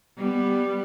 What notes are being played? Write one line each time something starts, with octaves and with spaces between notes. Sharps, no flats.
G3 B3